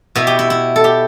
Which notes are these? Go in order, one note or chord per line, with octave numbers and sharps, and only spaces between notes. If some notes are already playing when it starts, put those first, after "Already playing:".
B2 B3 E4
G4
E4
E4
A4
G4